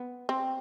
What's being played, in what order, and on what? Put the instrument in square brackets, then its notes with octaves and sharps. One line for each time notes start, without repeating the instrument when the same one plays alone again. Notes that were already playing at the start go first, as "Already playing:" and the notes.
Already playing: [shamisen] B3
C4